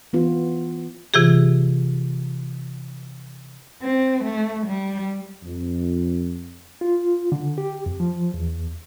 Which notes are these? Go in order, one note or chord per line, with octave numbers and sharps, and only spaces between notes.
E3 B3 F4
C3 E3 F4 G4 G#4
C4
A3
G3
F2
F4
D3
G4
F2
F3
E2